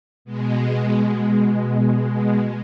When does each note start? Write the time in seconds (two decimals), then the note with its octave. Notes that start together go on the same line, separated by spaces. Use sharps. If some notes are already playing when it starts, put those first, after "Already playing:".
0.25 B2 G#3